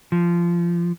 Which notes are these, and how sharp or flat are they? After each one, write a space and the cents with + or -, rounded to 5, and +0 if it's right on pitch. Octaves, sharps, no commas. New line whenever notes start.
F3 -20